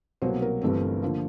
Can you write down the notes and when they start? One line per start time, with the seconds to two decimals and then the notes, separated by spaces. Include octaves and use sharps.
0.22 C2 B2 F#3 A#3 C5
0.42 A#4
0.62 G1 G2 E3 A3 C4
1.02 D3 F3 A#3